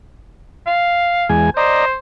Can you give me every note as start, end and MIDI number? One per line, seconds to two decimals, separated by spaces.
0.67 1.27 77
1.29 1.50 40
1.29 1.50 56
1.29 1.50 80
1.57 1.95 72
1.57 1.85 74
1.57 1.85 75
1.57 1.85 82